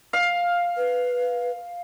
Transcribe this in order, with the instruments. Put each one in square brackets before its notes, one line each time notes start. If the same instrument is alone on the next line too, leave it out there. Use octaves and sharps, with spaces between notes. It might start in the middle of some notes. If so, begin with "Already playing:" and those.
[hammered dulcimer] F5
[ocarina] B4